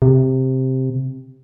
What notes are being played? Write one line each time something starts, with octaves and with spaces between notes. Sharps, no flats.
C3